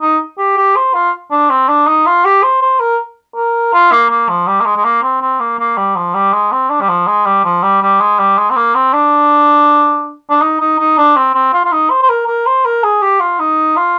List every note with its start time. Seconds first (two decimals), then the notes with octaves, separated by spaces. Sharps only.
0.01 D#4
0.38 G4
0.57 G4
0.76 C5
0.94 F4
1.32 D4
1.50 C4
1.68 D4
1.87 D#4
2.06 F4
2.25 G4
2.43 C5
2.62 C5
2.80 A#4
3.36 A#4
3.73 F4
3.92 A#3
4.10 A#3
4.29 F3
4.48 G3
4.61 A#3
4.66 G#3
4.76 G#3
4.85 A#3
5.03 C4
5.22 C4
5.40 A#3
5.59 A#3
5.78 G3
5.96 F3
6.14 G3
6.33 G#3
6.52 C4
6.70 D4
6.81 G3
6.89 F3
7.07 G#3
7.26 G3
7.45 F3
7.63 G3
7.82 G3
8.01 G#3
8.19 G3
8.38 G#3
8.51 C4
8.56 A#3
8.75 C4
8.93 D4
10.30 D4
10.42 D#4
10.60 D#4
10.79 D#4
10.98 D4
11.17 C4
11.35 C4
11.54 F4
11.65 F4
11.72 D#4
11.90 C5
12.03 C5
12.09 A#4
12.27 A#4
12.46 C5
12.65 A#4
12.84 G#4
13.02 G4
13.20 F4
13.39 D#4
13.76 F4